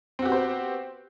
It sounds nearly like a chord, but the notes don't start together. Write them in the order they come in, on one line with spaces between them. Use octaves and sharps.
C4 F#4 G4 B3 C5